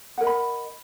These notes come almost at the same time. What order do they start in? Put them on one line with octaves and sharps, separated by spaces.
F#5 A#4 D#5 B5